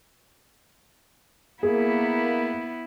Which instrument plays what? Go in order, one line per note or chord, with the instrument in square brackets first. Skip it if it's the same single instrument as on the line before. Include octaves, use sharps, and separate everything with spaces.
[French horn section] A#3 [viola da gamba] B3 E4 [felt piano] G#4